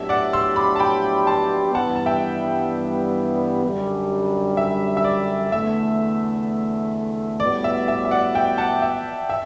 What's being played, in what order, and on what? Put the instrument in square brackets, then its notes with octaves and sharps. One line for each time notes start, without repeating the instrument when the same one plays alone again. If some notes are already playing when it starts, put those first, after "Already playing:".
Already playing: [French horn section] A2 F#3 B3 D4 G4 [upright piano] E5
[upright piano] D5 F#5
C6 E6
B5 D6
A5
G5 B5
A5 C6
[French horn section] G2 E3 G3 B3 [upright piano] F#5 A5
[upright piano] A5
E5 G5
[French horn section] F#2 D3 G3 D4
[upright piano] E5
E5
D5
[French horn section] E2 D3 A3 [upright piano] E5
[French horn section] A2 G3 B3 F#4 [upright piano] D5
[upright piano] E5
E5
E5
D5 F#5
E5 G5
F#5 A5
E5
E5